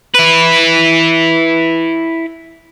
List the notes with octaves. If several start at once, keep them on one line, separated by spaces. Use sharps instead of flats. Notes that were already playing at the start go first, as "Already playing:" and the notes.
E4 B4